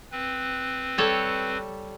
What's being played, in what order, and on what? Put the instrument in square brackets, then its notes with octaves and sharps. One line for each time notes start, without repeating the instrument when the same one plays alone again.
[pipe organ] C4 B4
[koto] G3 A4 C#5